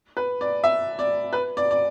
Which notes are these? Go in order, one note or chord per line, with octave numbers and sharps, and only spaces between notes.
B4
D5
E5
D5
B4
D5
D5